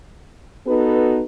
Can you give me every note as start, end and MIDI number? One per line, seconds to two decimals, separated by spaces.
0.67 1.22 59
0.67 1.22 63
0.67 1.22 66
0.67 1.22 69
0.67 1.22 71